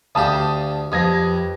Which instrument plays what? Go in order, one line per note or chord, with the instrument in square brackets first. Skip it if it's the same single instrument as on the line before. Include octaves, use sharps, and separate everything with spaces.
[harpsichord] D2 G4 [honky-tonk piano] F5 A5 D#6
[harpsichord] F2 [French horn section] G4 B4 [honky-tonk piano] D#6 G#6 A#6